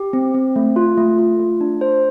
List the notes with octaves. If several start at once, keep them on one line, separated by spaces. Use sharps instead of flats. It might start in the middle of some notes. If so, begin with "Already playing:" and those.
Already playing: G4
C4
C4
A3
F4
A3
F4
A3
D4
C5